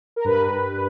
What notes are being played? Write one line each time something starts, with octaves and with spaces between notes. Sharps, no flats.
A#4
G2 B4